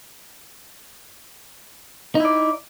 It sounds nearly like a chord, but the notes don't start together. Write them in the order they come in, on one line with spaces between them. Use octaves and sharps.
D#4 E4 D5